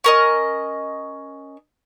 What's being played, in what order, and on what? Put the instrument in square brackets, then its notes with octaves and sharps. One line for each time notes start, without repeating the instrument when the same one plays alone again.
[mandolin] C#4 A#4 D#5